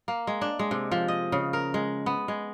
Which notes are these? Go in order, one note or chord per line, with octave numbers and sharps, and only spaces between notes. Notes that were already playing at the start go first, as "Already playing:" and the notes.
A#3
G#3
D4
G#3
C3
F3
D#5
C#3
A#4
G#3
B3
G#3